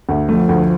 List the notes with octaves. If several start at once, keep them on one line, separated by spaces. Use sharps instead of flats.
D2
F3 A3
D2